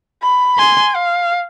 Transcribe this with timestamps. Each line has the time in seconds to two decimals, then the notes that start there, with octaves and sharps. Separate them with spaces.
0.23 B5
0.58 G#5 C6
0.96 F5